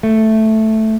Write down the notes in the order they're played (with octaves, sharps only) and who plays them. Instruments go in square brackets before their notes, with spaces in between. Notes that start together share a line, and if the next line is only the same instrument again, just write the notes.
[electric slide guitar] A3